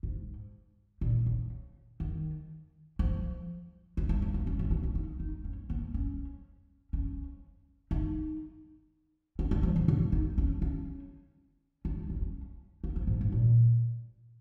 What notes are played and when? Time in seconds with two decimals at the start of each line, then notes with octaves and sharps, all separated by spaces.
0.03 G#2
1.01 A#2
1.26 C#3
2.00 D#3
2.99 F3
3.97 G#3
4.09 G#3
4.22 A#3
4.34 G#3
4.47 C#4
4.59 C#4
4.71 A#3
4.83 C#4
4.95 D#4
5.20 D#4
5.44 C#4
5.70 A#3
5.94 C#4
6.93 C#4
7.91 D#4
9.39 C#4
9.51 G#3
9.63 F3
9.76 C#3
9.88 C#3
10.12 D#4
10.38 C#4
10.62 C#4
11.85 C#4
11.97 D#4
12.10 C#4
12.21 C#4
12.84 A#3
12.96 F3
13.07 G#2
13.21 G#2
13.32 A#2